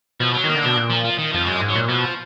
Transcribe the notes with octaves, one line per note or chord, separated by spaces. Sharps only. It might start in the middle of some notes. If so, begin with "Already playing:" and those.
B2 F3
F#3
D#3 A#3
D3
B2 D4
A#2
F3
F3
D#3
F2 F3
F#2 G#3
G#2
F#3
A#2
B2 F3